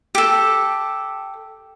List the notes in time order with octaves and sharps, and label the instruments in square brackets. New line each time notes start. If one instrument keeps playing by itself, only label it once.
[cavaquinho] G4 A4